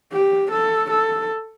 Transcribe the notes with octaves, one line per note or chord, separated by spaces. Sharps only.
G4
A4
A4